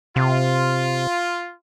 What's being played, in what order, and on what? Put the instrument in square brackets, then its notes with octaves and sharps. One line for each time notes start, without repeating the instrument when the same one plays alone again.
[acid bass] C3 [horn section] F4